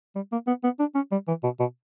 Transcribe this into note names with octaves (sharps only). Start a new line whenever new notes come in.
G3
A#3
B3
B3
D4
C#4
G3
E3
B2
B2